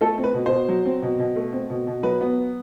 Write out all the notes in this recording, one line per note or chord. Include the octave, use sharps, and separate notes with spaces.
A3 A4
C4
B4
B2
C5
B2
F#3
C4
B2
B2
A3
C4
B2
B2
F#3 B4
B3